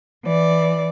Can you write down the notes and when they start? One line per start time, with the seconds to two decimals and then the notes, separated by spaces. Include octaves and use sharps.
0.23 E3 D5